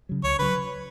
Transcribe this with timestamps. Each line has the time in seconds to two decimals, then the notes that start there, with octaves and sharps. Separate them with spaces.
0.09 C#3 F#3
0.24 C#2 C#5
0.39 C#3 F#3 B4